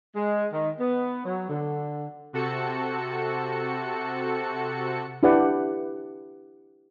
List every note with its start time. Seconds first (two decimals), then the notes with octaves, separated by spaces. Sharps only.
0.16 G#3
0.52 D#3
0.79 B3
1.25 F#3
1.49 D3
2.33 C3 F#4 A4 C#7
5.23 D4 E4 G4 B4 D5 F#5